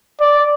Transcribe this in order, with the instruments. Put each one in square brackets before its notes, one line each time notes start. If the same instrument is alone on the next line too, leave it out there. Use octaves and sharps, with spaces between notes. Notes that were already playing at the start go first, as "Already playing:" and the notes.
[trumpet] D5